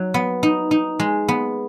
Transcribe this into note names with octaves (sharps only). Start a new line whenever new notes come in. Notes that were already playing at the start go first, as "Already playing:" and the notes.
Already playing: F#3 D#4
B3
D#4
D#4
G#3
B3